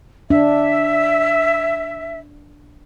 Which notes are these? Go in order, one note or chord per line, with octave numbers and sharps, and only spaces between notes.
D4 E5